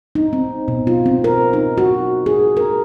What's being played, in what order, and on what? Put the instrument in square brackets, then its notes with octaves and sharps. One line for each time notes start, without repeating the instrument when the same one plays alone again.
[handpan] D#4
C4
B2
F4
C4
A#4
D#4
F#4
G#4
A#4